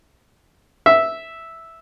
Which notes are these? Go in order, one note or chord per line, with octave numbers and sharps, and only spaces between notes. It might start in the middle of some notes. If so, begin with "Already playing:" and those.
E5